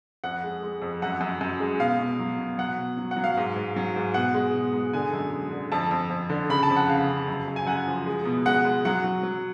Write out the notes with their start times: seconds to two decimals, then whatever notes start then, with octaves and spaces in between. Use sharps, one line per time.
0.24 F2 F#5
0.43 G#3
0.63 G#3
0.82 F2
1.02 F#2 F#5
1.21 F#2
1.41 F#2
1.60 G#3
1.79 B2 F5
1.99 B2
2.19 F#3
2.39 B2
2.58 F#3 F#5
2.79 B2
2.97 F#3
3.11 F#5
3.16 F#3
3.24 F5
3.37 G#2
3.56 G#2
3.76 F#3
3.96 G#2
4.14 B2 F#5
4.34 G#3
4.54 B2
4.73 G#3
4.93 D3 G#5
5.13 F#2
5.33 G#3
5.51 D3
5.72 F2 A5
5.91 F2
6.10 F2
6.30 D3
6.49 C#3 B5
6.63 A5
6.70 F2
6.76 F#5
6.88 C#3 F5
7.09 C#3
7.28 F#2
7.48 F#2
7.56 G#5
7.67 F#2 F#5
7.87 F3
8.06 G#3
8.25 B2
8.45 G#3 F#5
8.65 G#3
8.85 F#3 F#5
9.04 F#3
9.23 F#3